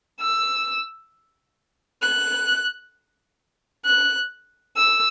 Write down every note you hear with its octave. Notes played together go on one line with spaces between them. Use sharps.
E6
F#6
F#6
E6